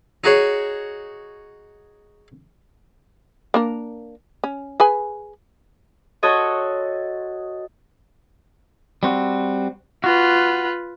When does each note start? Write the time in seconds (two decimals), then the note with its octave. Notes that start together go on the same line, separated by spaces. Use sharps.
0.24 D#4 F#4 G#4 C#5
3.54 A#3 D4 A#4
4.44 C#4
4.80 G#4 B4 G#5
6.23 F#4 A4 C#5 D#5 C6
9.03 G3 C4 F#4
10.04 F4 F#4 B4